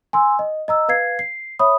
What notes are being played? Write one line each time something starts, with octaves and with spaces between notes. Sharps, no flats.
G#5 C6 E6
D#5
D#5 A#5 E6
B4 F5 G#6 C7
C7
C#5 E5 B5 D#6